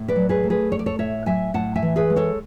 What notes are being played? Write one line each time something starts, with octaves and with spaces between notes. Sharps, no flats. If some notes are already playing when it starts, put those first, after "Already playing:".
Already playing: A2
B4 D5
F#3
G#4 B4
A3
G#4 B4
A2 C#5
D5
A4 C#5
A2 C#5 E5
F#3 E5 G#5
A2 F#5 A5
E5 G#5
E3
G#4 B4
G#3
A4 C#5